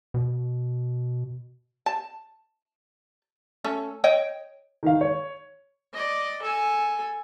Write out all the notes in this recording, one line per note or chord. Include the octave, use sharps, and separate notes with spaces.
B2
A5
A3 C#4 A4
C#5 D#5 G5
D#3 F5
C#5
D5 D#5
A4 G#5